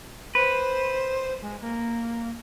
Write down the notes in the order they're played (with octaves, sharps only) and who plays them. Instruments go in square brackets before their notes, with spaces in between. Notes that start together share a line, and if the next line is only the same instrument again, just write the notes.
[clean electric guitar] B4 [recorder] C5
[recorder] G#3
A#3